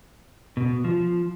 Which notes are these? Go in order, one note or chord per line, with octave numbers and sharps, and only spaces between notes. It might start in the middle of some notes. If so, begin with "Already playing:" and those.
B2
F3